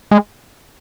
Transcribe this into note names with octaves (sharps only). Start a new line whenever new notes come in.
G#3